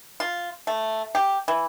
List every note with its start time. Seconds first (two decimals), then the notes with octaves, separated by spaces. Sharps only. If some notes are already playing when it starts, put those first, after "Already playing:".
0.20 F4
0.67 A3
1.15 G4
1.48 E3